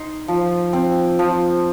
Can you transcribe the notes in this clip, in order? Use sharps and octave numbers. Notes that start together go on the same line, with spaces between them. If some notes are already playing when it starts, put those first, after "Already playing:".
Already playing: D#4 C6
F3
C4
F3